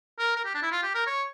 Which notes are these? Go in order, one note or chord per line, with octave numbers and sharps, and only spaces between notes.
A#4
A#4
G4
D4
E4
F4
G4
A#4
C#5